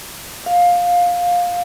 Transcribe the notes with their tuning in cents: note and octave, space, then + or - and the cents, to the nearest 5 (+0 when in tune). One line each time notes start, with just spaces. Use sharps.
F5 +15